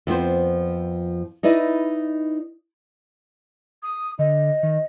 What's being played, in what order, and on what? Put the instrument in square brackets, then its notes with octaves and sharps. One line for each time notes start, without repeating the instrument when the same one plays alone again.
[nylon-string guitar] F2 F3 B3 C5
D#4 E4 B4 D5 D#5
[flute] D#6
[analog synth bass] D3 [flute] D#5
[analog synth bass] D#3